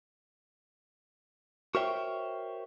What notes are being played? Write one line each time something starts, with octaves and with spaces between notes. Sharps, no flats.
F#4 A#4 C5 C#5 E5 G5